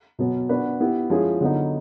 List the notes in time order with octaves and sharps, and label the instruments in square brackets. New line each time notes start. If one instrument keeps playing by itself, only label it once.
[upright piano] B2 F#3 B3
B3 D4 F#4 B4
B3 E4 G4
F3 G#3 C#4 E4 G#4
D3 F#3 B3 D#4